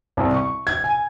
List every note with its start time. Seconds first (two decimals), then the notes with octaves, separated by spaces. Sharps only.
0.17 C2
0.34 C#6
0.67 G#6
0.84 G#5